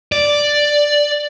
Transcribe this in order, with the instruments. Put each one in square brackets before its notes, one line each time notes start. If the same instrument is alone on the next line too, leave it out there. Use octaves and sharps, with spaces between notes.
[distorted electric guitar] D5